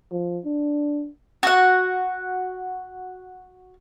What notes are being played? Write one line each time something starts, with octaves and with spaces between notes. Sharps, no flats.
F3
D4
F#4 F#5